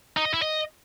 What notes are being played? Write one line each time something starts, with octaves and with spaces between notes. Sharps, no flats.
D#4
D#5
E4
D#5